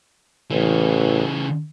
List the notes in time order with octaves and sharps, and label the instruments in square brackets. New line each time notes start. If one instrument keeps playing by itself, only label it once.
[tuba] A1 [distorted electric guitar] C#3 E3